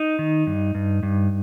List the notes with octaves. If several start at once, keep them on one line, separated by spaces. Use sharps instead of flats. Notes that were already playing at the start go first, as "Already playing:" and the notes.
Already playing: D#4
D#3
G2
G2
G2